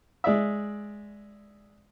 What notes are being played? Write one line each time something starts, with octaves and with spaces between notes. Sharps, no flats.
G#3 D5 E5